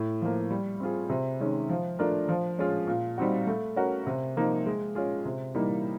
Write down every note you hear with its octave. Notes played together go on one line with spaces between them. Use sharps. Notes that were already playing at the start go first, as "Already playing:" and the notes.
Already playing: A2
F3 A#3
G3
C4 F4 G#4
C3
D#3 G#3 C#4
F3
A3 D4 F4 A#4
F3
G#3 C#4 F4 G#4
A#2
G3 C4 D#4 F#4
A3
C#4 F#4 A#4
C3
F3 A#3 D#4
G#3
C#4 F4 G#4
C3
E3 G3 A#3 D#4